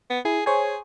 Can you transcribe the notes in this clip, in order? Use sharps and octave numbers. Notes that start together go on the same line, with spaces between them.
B3
E4 G#4
G#4 C5 C#5 G#5